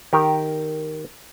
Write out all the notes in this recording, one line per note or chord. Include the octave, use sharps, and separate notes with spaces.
D#3 G4 A#4